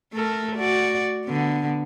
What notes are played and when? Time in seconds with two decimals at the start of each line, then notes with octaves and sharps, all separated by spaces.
0.13 A3 A4 A#4
0.56 F#4 D5
1.25 D3 B3